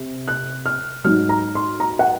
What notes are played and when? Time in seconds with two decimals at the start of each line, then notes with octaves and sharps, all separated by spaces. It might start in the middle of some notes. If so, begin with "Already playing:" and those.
Already playing: C3
0.28 F#6
0.66 F6
1.04 G#2 F#3 F6
1.29 A#5
1.55 C6
1.80 A#5
1.99 F#5